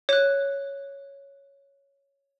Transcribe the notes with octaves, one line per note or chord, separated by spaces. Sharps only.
C#5 F#6